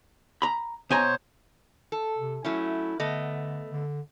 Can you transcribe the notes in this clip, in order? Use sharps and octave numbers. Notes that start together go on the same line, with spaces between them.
A#5 B5
B2 C5 C#5 G#5 A#5
A4
C3
F#3 A3 C#4 E4
D3 A3 B3 D#5
D3